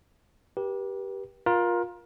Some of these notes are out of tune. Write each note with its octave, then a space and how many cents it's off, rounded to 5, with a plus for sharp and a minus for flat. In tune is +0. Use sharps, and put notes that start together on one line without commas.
G4 +0 B4 -40
F4 +15 A#4 +25